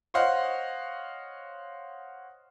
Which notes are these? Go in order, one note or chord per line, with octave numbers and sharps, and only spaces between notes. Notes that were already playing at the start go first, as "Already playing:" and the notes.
C5 C#5 D#5 F5 F#5